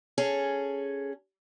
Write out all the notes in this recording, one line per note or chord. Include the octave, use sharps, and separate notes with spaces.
C#4 G#4 A4